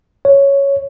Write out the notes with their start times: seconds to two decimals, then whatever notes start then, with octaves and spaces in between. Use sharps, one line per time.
0.25 C#5